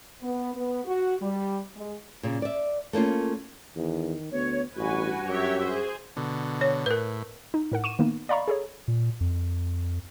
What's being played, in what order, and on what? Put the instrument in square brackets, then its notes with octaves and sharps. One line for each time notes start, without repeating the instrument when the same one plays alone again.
[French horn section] B3
B3
F#4
G3
G#3
[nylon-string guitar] A#2 C#3
D5 E5
A3 A#3 C#4 F4
[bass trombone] E2 [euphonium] D#3
[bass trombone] D2 [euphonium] B3 [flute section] C#5
[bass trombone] A1 [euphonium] G2 [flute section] F#4 [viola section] B4 G#5
[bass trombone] F#2 [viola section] G4 C#5 E5
[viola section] G#4 C5
[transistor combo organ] B2 D3
[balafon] C#5
[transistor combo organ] A2 [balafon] A#4 B4
[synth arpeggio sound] D#4
A2 A#4 F#5
C#6 D#7 E7
D#3 A#3 B3 D#4
D5 D#5 F5 A#5 B5 C#6
G#4 A4 C#5
[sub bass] A#2
F2